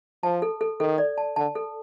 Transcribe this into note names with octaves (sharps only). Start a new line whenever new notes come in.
F3 A5
A4
A4
D#3 A4
D5
A5
D3 A5
A4